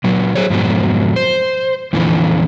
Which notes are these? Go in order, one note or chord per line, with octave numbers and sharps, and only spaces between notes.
A#2 F#3
G#4 C5 C#5
F2 G#2 B2 F#3
C5
F2 A#2 D3 E3 F3